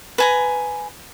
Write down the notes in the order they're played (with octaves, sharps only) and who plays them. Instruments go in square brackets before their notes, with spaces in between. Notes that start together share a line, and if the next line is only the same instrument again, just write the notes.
[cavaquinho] B4 G#5 A#5